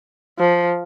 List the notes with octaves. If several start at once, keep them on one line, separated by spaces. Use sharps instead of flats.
F3